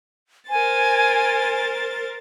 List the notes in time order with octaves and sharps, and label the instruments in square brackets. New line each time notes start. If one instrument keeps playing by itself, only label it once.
[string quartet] A#4 C5 A6 [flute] G#5